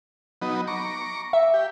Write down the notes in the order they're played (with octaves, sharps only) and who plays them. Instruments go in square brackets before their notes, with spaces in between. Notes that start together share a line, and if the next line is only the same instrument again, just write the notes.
[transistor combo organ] F#3 B3 D#4
A#5 C#6 D6
[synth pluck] E5
[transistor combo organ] G4